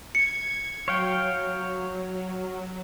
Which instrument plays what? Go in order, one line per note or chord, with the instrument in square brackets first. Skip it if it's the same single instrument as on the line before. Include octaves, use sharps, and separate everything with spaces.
[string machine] G#6 [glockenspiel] C#7
[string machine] F#3 [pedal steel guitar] C#5 F5 G5